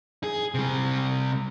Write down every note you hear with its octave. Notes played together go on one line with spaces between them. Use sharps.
G#4
C3 G3